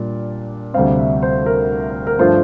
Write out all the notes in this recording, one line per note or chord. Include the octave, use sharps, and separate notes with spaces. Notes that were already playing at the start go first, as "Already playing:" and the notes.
Already playing: A#2 G3 D4 D5
D2 C3 G3 C4 F5
E5
C5
A#4
A#4
G2 F3 A3 D4 F4 C5